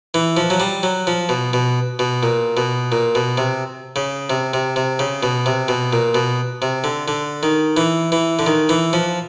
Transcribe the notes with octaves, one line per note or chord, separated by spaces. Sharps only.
E3
F3
F#3
G3
F#3
F3
B2
B2
B2
A#2
B2
A#2
B2
C3
C#3
C3
C3
C3
C#3
B2
C3
B2
A#2
B2
C3
D3
D3
D#3
E3
E3
D3
D#3
E3
F3